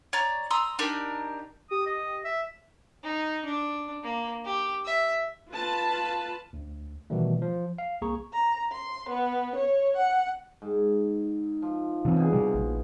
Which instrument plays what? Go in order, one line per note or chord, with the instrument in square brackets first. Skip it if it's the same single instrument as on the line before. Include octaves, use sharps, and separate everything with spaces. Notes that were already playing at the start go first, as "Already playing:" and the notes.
[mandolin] C#5 D5 A#5
A#5 C6 D#6 E6
D4 D#4 G4 A#4
[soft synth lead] G4 [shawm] D#6
[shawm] D#5
E5
[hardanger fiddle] D#4
D4
A#3
G4
E5
[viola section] F4 B4 A5
[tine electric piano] D2
B2 D#3 E3 G3 A3
F3
F5
C2 A#3 G#4 A#5 C#6
[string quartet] A#5
C6
B3
C#5
F#5
[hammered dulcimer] G#2
F3
[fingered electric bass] C3 E3 C4
[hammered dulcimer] B2 G#4
[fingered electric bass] C3 G3
A#1